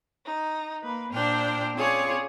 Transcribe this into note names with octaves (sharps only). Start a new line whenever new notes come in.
D#4
A#3 B4
A#2 D4 C5 G5 F6
C4 C#4 F4 G#4 C#5 D5